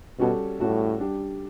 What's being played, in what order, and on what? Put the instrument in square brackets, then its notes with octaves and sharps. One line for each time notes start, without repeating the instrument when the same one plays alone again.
[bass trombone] B2 [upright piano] G3 C#4 F#4 A4
[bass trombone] A2 [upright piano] G3 C#4 F#4 A4
[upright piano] G3 D4 G4